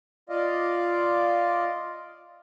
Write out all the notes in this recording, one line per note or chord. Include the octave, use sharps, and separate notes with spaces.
F4 D5 D#5 F5